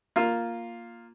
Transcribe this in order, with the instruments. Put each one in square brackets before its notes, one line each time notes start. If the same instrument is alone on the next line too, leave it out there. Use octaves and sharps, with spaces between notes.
[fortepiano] A#3 F4